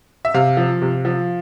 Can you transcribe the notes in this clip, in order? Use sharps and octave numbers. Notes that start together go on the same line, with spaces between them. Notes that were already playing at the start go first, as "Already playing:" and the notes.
E5
C3 F5
F3
C3
F3